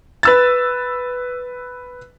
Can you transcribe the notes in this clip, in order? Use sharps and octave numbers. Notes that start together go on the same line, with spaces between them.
B4 E6 A6